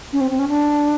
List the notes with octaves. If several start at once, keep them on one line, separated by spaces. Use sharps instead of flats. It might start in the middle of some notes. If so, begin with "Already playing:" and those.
C#4
C4
C4
C#4
D4